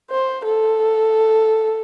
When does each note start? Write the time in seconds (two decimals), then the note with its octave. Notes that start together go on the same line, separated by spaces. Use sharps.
0.11 C5
0.45 A4